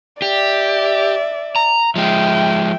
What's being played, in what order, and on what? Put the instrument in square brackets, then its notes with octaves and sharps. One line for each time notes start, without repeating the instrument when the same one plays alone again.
[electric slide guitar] G4 [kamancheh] D5 E5
[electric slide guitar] A#5
[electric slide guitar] F3 G#3 [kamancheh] E5 G5